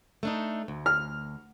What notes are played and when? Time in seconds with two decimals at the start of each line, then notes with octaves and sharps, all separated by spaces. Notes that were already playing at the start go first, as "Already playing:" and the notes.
0.23 A3 D4 D#4
0.68 D2
0.86 F6